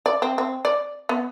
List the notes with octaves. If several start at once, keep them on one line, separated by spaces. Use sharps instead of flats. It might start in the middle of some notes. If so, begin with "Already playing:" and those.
D5
C4
C4
D5
B3